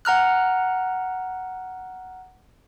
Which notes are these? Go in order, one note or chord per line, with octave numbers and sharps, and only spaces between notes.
F#5 A#5 F6 F#6